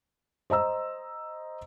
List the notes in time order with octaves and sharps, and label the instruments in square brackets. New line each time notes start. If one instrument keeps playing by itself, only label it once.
[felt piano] C5 D#5 A#5 E6